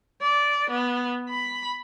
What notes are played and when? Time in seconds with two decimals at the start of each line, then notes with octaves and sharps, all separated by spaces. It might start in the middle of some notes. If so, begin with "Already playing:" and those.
0.22 D5
0.70 B3
1.29 B5